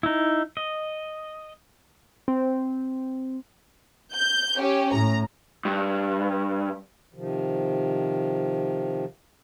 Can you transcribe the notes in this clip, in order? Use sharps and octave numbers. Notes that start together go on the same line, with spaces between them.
D#4 E4
D#5
C4
G6
C#4 G4
A2 A#5
G2
C3 D#3 F3